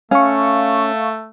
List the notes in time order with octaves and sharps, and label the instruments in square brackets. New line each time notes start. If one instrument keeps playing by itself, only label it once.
[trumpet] A3 [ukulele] C#4 [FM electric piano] F5 C#6